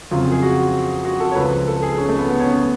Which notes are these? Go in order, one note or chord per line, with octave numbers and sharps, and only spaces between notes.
F2 C#3 F#3 F4
G#4
F#4
F#4
A4
C#5
C#2 C#3 F3 B4
A4
G#4
C#4
A3
B3
B3
C#4
B3